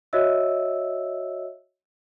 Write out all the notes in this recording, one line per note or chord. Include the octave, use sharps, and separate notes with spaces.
F#4 C#5 D#5 E5 E6